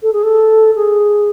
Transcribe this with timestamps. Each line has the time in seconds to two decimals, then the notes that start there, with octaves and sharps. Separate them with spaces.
0.03 A4
0.13 G#4
0.23 A4
0.75 G#4